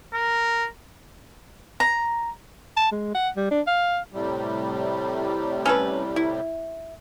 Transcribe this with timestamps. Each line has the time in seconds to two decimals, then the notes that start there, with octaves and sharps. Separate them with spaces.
0.14 A#4
1.80 A#5
2.77 A5
2.92 G#3
3.15 F#5
3.37 G3
3.51 D4
3.67 F5
4.13 A2 C3 G3
5.66 C#4 A4 B4
6.16 E4